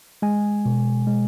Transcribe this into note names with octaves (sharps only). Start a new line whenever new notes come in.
G#3 G#5
B2
G#3